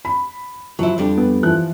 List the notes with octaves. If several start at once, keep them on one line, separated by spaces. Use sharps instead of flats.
B5
F3 F#3 E4
F2 G3 D4
B3
E3 F3 F#6